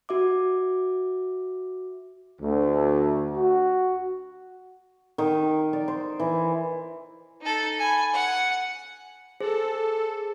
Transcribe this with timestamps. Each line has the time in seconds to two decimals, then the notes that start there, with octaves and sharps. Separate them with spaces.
0.09 F#4 E5 D6
2.41 D2
3.35 F#4
5.18 D#3
5.73 D5
5.88 C5
6.20 E3
7.42 D#4 A4
7.79 G#5 B5
8.13 F#5
9.41 G#4 A4 C5